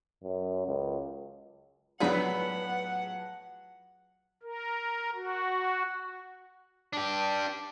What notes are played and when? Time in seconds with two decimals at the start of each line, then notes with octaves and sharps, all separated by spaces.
0.24 F#2
0.67 C#2
2.00 A2 F#3 B3 D4 F4 G#4 F#5 B5
4.43 A#4
5.14 F#4
6.93 D4 G4